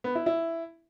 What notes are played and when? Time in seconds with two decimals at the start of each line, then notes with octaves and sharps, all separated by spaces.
0.04 B3
0.15 E4
0.26 E4